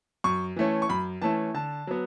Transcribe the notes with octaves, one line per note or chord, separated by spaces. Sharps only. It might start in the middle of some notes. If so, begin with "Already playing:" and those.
F#2 C#6
E3 A3 C#4
C#6
F#2 B5
E3 A3 C#4 A5
D3 A5
F#3 B3